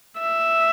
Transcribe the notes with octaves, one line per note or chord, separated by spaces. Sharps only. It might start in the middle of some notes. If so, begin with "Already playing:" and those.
E5